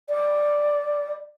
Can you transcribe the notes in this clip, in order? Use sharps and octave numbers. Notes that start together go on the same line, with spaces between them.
D5